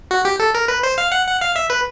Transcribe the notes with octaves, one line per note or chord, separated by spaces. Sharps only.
F#4
G4
A4
A#4
B4
C5
F5
F#5
F#5
F5
E5
B4